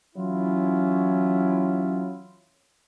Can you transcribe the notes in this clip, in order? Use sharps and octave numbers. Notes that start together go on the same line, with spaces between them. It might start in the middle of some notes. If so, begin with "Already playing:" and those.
E3 F#3 C#4 E4 F4